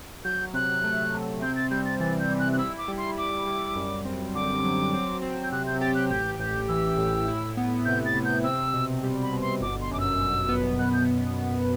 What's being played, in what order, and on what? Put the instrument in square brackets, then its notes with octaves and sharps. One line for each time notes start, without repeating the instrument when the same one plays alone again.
[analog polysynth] F#3 [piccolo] G6
[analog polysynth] C3 [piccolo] F#6
[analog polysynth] A3
C3
[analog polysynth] C4 [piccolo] G6
[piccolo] A6
[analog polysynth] G3 [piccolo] G6
[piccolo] A6
[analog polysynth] E3 [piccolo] A6
[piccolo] G6
[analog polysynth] G3
[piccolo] F#6
F#6
[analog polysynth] E4 [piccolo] E6
[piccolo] D6
[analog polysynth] G3
[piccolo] C6
[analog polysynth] E4 [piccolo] D6
[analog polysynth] G3
F#2
C4
[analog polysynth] D3 [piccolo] D6
[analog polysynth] F#3
C4
C4
[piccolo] G6
[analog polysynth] C3 [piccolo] F#6
[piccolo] G6
[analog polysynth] G4 [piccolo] A6
[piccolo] F#6
[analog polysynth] A1 [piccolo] G6
[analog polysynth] A1 [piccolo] G6
[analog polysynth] E3 [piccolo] E6
[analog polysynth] A2
E4
B3
[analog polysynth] C3 [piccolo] G6
[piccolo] A6
[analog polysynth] C3
[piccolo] G6
[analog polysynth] C4 [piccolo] E6
[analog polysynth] B2
G3
[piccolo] B5
[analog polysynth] B2
[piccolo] C6
[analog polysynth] G1 [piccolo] D6
[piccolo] C6
[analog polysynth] F#2 [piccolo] D6
[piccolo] E6
[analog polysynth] F#2
B3
[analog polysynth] B2 [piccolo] F#6
[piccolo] G6